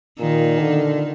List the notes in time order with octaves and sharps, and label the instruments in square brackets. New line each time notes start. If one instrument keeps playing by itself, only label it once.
[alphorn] A#2 [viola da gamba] D#3
[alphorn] D3